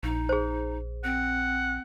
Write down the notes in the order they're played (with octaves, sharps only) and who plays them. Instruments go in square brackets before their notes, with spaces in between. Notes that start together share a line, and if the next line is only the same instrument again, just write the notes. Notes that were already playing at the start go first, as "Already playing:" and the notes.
[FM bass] A#1 [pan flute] D#4
[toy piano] G#4 C5
[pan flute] C4 [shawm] F#5